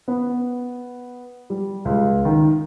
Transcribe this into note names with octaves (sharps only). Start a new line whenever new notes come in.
B3
G3
C#2
D#3